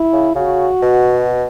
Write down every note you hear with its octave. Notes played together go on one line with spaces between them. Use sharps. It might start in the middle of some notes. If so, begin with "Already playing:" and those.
Already playing: E4
C#3
C#3 F#4
B2